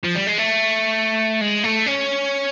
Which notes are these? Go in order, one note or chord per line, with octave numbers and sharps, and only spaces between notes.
F3
G3
G#3
A3
G#3
A3
C#4